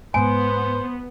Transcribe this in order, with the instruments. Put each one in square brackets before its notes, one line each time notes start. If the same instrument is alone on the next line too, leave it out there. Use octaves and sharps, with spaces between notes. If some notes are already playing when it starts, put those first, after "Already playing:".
[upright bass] G#2 G#3 [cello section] B3 [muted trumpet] C5 [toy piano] G#5